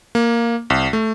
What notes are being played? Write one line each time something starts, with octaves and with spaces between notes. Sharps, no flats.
A#3
C2
A3